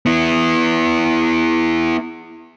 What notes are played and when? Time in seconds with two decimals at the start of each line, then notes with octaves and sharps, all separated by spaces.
0.06 B3 E4